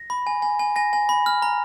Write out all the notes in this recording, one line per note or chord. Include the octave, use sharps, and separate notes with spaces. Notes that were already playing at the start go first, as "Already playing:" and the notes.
Already playing: A#6
B5
G#5
G#5
G#5
G#5 A#6
G#5
B5
F6
A#5